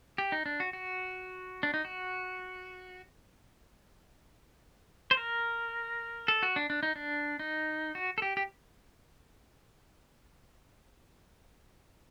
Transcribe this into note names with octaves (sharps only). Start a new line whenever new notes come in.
G4
D#4
D4
F#4
F#4
D4
D#4
F#4
C5
A#4
A4
F#4
D4
D4
D#4
D4
D#4
F#4
A4
G4
G4